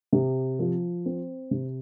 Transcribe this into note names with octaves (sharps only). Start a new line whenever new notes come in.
C3
F3
C4
C3